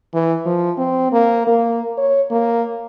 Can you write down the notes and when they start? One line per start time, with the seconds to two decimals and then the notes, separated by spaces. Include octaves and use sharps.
0.14 E3
0.46 F3
0.78 C4
1.12 A#3
1.47 A#3
1.98 C#5
2.31 A#3